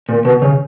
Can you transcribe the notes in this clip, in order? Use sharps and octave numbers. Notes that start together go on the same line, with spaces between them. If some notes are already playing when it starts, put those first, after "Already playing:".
A#2
B2
C#3